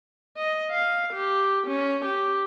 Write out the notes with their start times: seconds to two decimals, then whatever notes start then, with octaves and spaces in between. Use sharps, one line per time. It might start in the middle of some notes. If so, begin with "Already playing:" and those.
0.37 D#5
0.72 F5
1.14 G4
1.67 C#4
2.05 G4